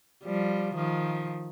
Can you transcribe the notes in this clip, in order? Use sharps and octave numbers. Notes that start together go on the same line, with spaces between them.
F3 G3
D#3 F3